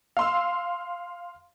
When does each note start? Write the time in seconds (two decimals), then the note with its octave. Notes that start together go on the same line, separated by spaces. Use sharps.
0.17 F5 C6 E6